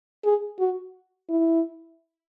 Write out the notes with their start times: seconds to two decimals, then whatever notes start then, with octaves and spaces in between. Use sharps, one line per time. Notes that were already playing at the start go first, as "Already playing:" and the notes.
0.25 G#4
0.59 F#4
1.29 E4